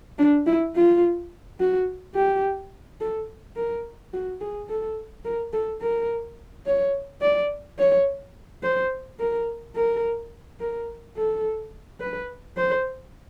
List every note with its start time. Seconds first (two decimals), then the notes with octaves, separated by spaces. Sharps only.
0.18 D4
0.47 E4
0.75 F4
1.60 F#4
2.15 G4
3.01 A4
3.56 A#4
4.13 F#4
4.41 G#4
4.69 A4
5.25 A#4
5.53 A4
5.81 A#4
6.66 C#5
7.22 D5
7.79 C#5
8.63 C5
9.20 A#4
9.76 A#4
10.60 A#4
11.17 A4
12.01 B4
12.57 C5